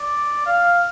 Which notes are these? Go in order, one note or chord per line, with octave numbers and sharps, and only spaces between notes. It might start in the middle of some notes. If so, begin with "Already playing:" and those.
Already playing: D5
F5